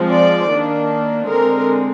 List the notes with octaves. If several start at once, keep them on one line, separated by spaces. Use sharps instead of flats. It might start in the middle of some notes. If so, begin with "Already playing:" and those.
Already playing: F3 G#3 C4
D5
D#3 A#3 D4
D3 G#3 C4 A#4